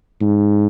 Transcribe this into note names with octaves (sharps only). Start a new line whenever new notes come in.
G#2